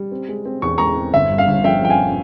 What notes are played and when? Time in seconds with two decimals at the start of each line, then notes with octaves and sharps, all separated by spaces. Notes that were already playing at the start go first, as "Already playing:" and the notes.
Already playing: G3
0.12 C4
0.29 G#3
0.45 C4
0.62 E2 C#6
0.78 G#3 A#5 C#6
0.96 C4
1.13 G1 E5
1.30 G2
1.38 F5
1.48 G1
1.64 F3 E5 G5
1.81 F3 G5
1.90 F5 G#5